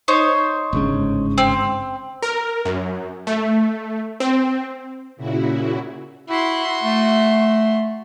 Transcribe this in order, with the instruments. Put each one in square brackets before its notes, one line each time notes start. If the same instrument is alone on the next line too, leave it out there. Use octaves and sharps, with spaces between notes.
[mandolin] D#4 C5 C#5
[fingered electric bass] G1 G#2 C#3
[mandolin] C4
[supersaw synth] A#4
F#2
A3
C4
[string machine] A#2 C#3 E4 F#4
[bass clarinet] E4 [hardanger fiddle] F#4 C6
[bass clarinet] A3